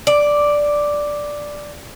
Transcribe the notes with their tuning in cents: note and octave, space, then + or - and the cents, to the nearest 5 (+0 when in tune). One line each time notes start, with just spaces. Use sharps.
D5 +0